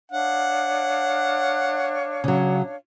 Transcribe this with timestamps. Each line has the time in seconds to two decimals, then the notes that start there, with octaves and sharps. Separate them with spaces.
0.11 D4 C#5 F5 F#5
2.24 C#3 F#3